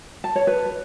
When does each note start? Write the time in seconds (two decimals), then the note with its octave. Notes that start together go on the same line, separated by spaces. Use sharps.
0.24 A5
0.36 C#5
0.47 B4